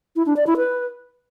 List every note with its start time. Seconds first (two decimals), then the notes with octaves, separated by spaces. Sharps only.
0.16 E4
0.26 D4
0.36 D5
0.47 E4
0.57 B4